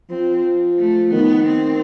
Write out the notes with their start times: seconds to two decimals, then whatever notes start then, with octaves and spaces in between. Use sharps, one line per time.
0.10 F3 C4
0.78 A3
1.13 D#3 B3
1.47 C4